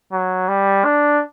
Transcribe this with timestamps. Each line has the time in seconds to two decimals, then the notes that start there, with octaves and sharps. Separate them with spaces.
0.12 F#3
0.48 G3
0.85 D4